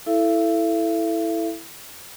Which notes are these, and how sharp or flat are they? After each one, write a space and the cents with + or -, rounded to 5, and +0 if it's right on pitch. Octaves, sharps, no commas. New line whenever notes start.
E4 +0 A4 +0 E5 +45